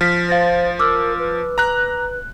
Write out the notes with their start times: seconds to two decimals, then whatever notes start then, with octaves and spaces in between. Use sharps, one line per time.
0.01 F3 F6 B6
0.29 C5 F5 A6 A#6
0.79 A#4 D6 E6 F6
1.19 B4
1.58 A#5 F#6